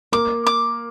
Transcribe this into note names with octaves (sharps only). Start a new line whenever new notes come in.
A#3 D6
D6